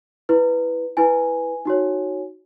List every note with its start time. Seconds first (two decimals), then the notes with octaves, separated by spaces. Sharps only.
0.29 E4 B4
0.97 E4 B4 G#5
1.65 D#4 F#4 C#5